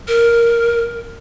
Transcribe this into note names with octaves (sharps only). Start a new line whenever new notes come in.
A#4